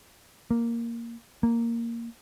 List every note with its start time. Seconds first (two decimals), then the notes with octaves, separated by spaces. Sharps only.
0.51 A#3
1.43 A#3